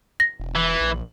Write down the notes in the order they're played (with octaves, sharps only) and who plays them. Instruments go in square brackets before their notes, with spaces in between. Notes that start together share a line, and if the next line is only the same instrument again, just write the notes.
[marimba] A#6
[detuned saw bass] E1
[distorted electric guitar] E3
[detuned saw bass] A#1